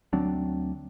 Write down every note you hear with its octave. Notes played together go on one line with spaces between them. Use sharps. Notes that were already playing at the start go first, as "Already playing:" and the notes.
D2 F#3 C4 D4